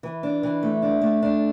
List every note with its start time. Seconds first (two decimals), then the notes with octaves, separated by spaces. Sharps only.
0.03 E3
0.23 D4
0.43 E3
0.63 A3
0.82 D4
1.02 A3
1.22 D4